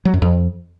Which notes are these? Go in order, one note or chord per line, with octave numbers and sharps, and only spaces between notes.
F#3
F#2
F2